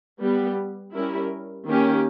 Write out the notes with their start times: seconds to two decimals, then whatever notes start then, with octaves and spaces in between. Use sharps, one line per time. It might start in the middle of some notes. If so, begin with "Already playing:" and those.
0.19 G3 B3 G4
0.93 G3 C#4 E4 A#4
1.66 D#3 A#3 C#4 G4 A#4